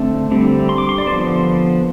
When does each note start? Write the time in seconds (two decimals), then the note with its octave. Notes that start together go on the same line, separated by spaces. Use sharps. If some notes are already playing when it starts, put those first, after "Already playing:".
Already playing: D3 A3 C4
0.31 D3 G3 C4
0.69 C6
0.78 D6
0.89 C6
0.98 D5
1.07 D3 F3 B3 C5